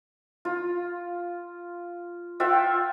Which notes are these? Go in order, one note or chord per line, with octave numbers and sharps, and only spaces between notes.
F4
F4 E5 F#5 G5